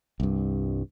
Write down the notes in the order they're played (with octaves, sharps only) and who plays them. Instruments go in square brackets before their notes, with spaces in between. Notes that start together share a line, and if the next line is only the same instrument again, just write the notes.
[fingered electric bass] C2 G2